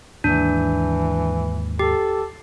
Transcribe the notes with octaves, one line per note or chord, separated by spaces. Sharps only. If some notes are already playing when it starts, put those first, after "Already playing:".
D#2 G#2 E3 A#3 D4
G4 A4